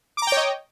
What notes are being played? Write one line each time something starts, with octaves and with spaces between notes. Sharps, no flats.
C#5 D#5 G5 A#5 D6